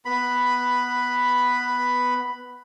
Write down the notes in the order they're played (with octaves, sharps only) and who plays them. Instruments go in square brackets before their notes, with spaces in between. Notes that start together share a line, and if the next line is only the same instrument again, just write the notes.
[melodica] B3 B5